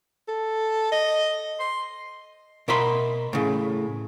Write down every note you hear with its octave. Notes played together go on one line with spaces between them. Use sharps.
A4
D#5
C6
B2 A#4 E5 B5 C6
A2 C#3